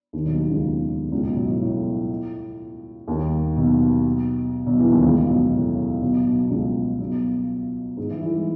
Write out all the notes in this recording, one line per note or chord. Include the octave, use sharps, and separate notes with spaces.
D#2 D#3
B1 B2
D#2 D#3
C#2 C#3
C#2 C#3
B1 B2
B1 B2
A2
A2
D#2 D#3
B1 B2
B1 B2
E2 E3
D#2 D#3
C#2 C#3
B1 B2
A2
B1 B2
B1 B2
C#2 C#3
B1 B2
G#2 G#3
E3 E4
E3 E4
G#3